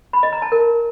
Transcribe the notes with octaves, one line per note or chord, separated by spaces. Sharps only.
B5
D#5
A#5
A5
A#4